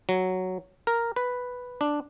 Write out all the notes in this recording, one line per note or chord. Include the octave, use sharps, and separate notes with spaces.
F#3
A#4
B4
D4